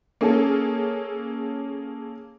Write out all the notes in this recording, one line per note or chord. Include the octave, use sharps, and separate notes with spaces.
A#3 C#4 G#4 A4